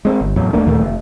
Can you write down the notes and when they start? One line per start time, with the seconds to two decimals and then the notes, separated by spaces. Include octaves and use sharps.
0.05 G#3 C4
0.21 G1
0.36 E2 A2 F#3
0.53 D#1 A3 A#3 D4
0.66 D#2 A#2 D#3 A3
0.81 F1